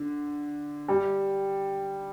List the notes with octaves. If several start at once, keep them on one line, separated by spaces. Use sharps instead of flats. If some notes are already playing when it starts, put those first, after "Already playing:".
Already playing: D3
G3